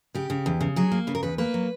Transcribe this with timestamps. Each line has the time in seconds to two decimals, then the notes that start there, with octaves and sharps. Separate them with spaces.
0.15 C#3 G4
0.30 C#3
0.46 E2
0.61 C#3
0.76 F#3 G#4
0.92 A#3
1.07 C#3 B4
1.15 A#4
1.23 E2 B4
1.38 A#3 B4
1.54 F#3